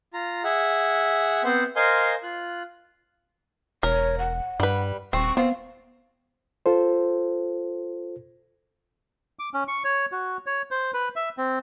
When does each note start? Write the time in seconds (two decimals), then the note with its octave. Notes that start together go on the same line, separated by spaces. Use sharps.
0.14 F4 A#5
0.44 G#4 E5 F#5
1.44 B3 C4 C5 F#5
1.76 A#4 C5 D#5 F5 G#5 C6
2.23 F4 F#6
3.83 E1 A#4 C#5
4.19 F#5
4.60 G2 G3 B4
5.13 D#1 C4 C#6
5.37 B3 C4 F5
6.66 F4 A4 C5
9.39 D6
9.54 C#4
9.68 C#6
9.84 C#5
10.12 F#4
10.46 C#5
10.71 C5
10.94 B4
11.16 E5
11.38 C4